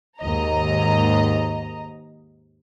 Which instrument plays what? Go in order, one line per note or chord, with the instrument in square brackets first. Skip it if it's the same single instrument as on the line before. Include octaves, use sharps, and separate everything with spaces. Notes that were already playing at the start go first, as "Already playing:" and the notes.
[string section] D#2 G#2 D#5 A#5